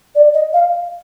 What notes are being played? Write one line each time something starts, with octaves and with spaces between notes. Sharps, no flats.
D5
D#5
F5